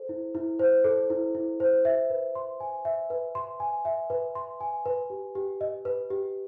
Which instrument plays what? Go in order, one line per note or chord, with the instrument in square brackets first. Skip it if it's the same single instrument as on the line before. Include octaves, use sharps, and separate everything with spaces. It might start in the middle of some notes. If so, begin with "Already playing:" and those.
Already playing: [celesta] A4 C5
E4
E4
C5
A4
E4
E4
C5
E5
B4
C6
G#5
E5
B4
C6
G#5
E5
B4
C6
G#5
B4
G4
G4
D#5
B4
G4